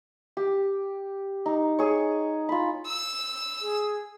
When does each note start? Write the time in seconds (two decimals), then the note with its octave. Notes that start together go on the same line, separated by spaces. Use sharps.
0.37 G4
1.46 D#4
1.79 G#4 C#5
2.49 F4 B5
2.86 E6
3.61 G#4